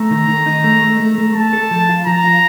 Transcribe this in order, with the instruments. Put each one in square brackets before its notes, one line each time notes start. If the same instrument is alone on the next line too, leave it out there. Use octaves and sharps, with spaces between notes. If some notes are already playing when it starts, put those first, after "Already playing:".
Already playing: [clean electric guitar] A3 [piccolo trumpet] A#5
[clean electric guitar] D#3
D#3
D#4
A3
A3
A3
A3
[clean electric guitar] A3 [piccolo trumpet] A5
[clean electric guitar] A4
F3
F4
[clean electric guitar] F3 [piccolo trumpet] A#5
[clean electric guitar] F4